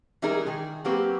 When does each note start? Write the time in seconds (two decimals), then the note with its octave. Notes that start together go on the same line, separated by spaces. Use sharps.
0.22 E3 G3 G#3 D#4 G#4 A#4
0.46 D#3 G#4
0.85 F#3 A#3 C4 G4 B4